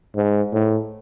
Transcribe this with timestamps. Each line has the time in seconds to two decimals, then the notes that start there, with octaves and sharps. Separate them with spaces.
0.16 G#2
0.53 A2